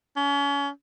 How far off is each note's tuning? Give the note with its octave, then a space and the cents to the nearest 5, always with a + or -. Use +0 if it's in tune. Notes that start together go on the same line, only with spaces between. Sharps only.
C#4 +35